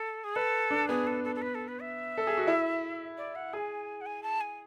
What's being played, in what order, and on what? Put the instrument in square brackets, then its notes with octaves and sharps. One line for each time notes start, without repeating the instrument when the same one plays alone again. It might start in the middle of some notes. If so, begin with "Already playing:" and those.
Already playing: [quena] A4
G#4
[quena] A4 [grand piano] B4
[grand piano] D4
[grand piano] B3 [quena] G#4
[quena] A4
A4
A4
B4
A4
B4
E5
[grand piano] A4
G#4
F#4
E4
[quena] D5
F#5
[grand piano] G#4 [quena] G#5
[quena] F#5
G#5
A5
G#5